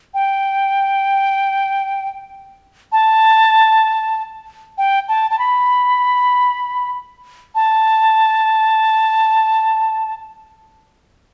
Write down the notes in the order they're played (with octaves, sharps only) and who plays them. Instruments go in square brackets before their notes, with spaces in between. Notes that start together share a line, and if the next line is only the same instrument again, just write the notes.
[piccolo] G5
A5
G5
A5
A5
B5
A5